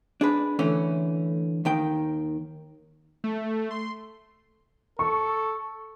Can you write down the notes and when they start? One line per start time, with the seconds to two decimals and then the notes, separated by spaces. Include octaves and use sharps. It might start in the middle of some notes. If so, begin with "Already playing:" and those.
0.21 D4 G#4 B4
0.59 D3 E3 A3 C#4
1.65 D#2 D#3 G5
3.24 A3
3.71 C6
4.99 A4 C#6